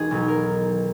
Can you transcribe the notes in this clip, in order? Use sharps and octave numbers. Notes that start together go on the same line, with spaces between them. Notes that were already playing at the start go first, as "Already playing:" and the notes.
Already playing: E1 D#3 G#4
B1 B2 F#3
A#4